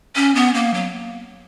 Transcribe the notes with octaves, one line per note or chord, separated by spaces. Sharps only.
C#4
B3
A#3
F#3